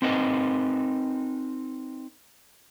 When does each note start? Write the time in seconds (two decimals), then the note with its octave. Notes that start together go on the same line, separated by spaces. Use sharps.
0.02 C4 D#4 A#4 B4 D#5